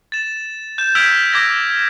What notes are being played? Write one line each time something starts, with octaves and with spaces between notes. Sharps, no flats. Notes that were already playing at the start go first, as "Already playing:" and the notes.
A6 E7
G6 E7
E6 F6 G#6 B6 D7 F7
D6 G#6 A#6